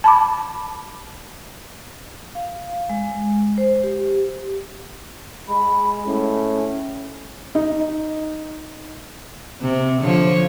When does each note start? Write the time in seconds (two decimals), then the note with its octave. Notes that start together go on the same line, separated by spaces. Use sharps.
0.04 A5 B5 D6
2.35 F5
2.90 G#3
3.58 C5
3.84 G4
5.49 G#3 B5
6.06 A2 C#4
7.55 D#4
9.61 C3
10.01 D3 F3 C#5